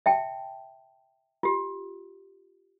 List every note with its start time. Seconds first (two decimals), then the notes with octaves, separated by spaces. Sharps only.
0.06 E5 G5 A5
1.43 F4 G4